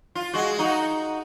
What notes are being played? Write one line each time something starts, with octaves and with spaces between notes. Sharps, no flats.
F4
G#3 F#4
D#4 F#4